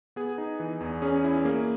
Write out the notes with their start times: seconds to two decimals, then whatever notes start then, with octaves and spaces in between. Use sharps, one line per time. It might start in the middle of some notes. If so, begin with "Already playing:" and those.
0.16 B3 G#4
0.38 D#4
0.60 E3
0.81 E2
1.02 C#4 G#4
1.24 E4
1.45 A#3 G#4